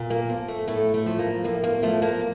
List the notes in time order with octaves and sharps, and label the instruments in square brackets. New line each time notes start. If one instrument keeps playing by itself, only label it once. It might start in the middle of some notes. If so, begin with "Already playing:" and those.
Already playing: [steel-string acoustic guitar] A#2
A#3
F3
A3
A2 A3
A3
F3
A#3
A2 A#3
A#3
F3 A3
A#3